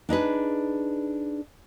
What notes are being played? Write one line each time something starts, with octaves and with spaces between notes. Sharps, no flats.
D4 D#4 G#4 B4